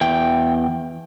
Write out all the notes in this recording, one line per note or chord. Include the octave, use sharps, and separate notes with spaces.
E2 G5